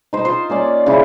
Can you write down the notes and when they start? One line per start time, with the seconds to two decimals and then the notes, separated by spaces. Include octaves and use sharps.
0.13 D#4 C5
0.25 F4 C5
0.50 A#3 C#4 D5
0.86 C#3 C4 E4